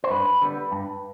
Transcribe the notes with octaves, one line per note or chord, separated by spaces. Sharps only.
C5
G2 B4
D3 G3 B3
G2